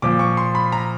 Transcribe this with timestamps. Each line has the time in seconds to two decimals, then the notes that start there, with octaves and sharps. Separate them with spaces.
0.02 A#2 F3 D6
0.19 C#6
0.37 C6
0.55 B5
0.72 A#5